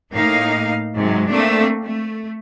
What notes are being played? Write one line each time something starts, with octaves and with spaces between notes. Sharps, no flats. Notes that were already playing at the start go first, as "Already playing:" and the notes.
A2 A#3 D#4 F5
G#2 C3 F#3 G#3
A3 A#3 C4 D4
A3